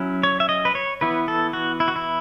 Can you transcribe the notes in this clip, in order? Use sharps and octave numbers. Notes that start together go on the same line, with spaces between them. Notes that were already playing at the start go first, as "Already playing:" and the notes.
Already playing: F#3 C#4 E4
C#5
E5
D#5
B4
C#5
E3 B3 E4 B4
A4
F#4
E4
F#4
E4